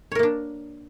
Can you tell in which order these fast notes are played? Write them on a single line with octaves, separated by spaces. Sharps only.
C#5 A#4 A#3 D4